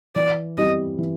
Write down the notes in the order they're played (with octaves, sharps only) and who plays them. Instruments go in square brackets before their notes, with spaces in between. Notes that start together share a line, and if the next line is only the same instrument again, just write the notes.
[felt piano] E3 [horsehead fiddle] D5
[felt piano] G3 C4 E4 G4 [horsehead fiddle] D#5
[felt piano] E3